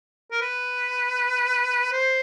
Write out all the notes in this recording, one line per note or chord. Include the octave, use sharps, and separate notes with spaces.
A#4
B4
C5